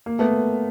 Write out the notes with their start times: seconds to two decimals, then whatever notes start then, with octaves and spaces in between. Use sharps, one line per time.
0.06 A#3
0.19 A3 B3